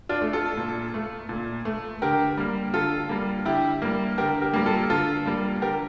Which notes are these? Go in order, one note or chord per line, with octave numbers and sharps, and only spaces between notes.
D4 F4
A3
F4 A4
A#2
A3
A#2
A3
D3 G4 A#4
G3 A#3
D3 F4 A4
G3 A#3
D3 E4 G4
G3 A#3
D3 G4 A#4
G4 A#4
G3 A#3
F4 A4
D3 F4 A4
G3 A#3
D3 G4 A#4